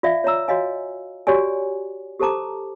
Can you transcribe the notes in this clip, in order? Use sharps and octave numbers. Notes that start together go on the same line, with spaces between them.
F4 D5 E5 F5
C#5 E5 A#5 E6
F#4 C#5 D#5 F5 G#5
F#4 G4 C#5 D5 G#5
G4 A4 C5 A5 A#5 D6